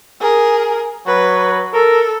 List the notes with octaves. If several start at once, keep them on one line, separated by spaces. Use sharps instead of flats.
G#4 A#4
F#3 B4
A4 A#4